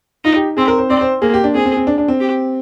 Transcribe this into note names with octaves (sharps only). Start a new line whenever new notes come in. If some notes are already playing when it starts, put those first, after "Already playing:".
D#4 F4
G4
C4 G#4
A#4
C5
C4 D5
C5
A#3 G#4
G4
D4
C4 G#4
C4
C4
D4
D4
C4
G4